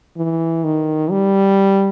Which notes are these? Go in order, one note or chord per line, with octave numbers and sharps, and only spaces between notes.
E3
D#3
G3